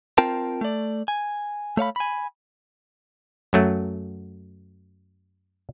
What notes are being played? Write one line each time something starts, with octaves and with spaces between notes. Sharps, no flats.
C4 F4 A#4 G5 A5
A3 D5
G#5
A3 C#5 F5 B5
G#5 B5
F#2 F#3 A3